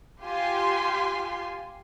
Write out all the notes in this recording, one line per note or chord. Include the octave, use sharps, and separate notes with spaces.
F4 G4 G#5 C6